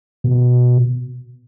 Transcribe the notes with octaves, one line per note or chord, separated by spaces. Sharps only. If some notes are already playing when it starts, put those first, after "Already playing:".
B2